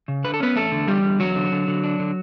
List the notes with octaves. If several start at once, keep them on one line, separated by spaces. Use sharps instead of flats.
C#3
D3 B4
A4
B3 C#4 B4
E2 A3 A4
D3
E2 G3 G4
D3
E2 F#3 F#4
D3
D3
D3
D4
D3